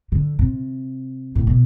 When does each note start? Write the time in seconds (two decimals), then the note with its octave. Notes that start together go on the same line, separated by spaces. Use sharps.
0.12 D3
0.39 C3
1.35 A2
1.47 B2